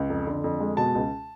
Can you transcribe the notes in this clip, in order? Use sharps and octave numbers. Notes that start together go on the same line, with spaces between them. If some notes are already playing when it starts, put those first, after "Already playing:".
Already playing: C#2
F2
D3
F2
G#3
B2 A5
C#2